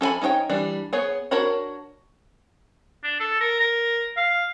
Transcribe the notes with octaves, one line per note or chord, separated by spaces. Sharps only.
C#4 A4 C5 G#5 B5
C#4 D#4 C5 C#5 G5
E3 G3 D4
B3 G#4 C#5
D4 F#4 A#4 C#5 B5
D4
A4
A#4
A#4
F5